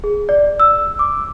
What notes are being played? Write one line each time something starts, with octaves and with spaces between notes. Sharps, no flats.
G#4
D5
E6
D6